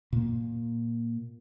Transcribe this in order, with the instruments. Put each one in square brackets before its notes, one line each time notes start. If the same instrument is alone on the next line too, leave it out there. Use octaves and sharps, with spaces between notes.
[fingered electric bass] A#2 A#3